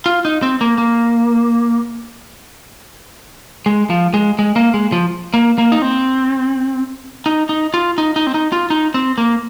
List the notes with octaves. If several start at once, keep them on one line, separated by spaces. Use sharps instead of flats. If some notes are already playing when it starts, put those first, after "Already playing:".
F4
D#4
C4
A#3
A#3
G#3
F3
G#3
G#3
A#3
G#3
F3
A#3
A#3
D#4
C4
D#4
D#4
F4
D#4
D#4
C4
D#4
F4
D#4
C4
A#3